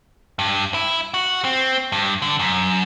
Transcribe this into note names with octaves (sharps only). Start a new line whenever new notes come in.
G2
E4
F#4
C4
G2
D3
F#2